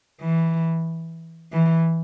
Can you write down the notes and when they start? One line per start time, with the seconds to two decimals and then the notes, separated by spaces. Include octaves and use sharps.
0.21 E3
1.52 E3